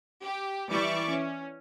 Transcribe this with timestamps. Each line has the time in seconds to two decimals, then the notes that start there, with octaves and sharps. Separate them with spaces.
0.21 G4
0.69 E3 G3 D5 E5 C#6 D6
1.10 C#4